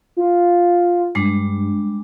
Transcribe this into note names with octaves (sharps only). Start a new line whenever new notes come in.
F4
G2 G3 G#3 D4